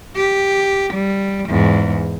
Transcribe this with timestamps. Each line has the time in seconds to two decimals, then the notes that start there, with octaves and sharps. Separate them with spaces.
0.16 G4
0.94 G3
1.49 E2 G#2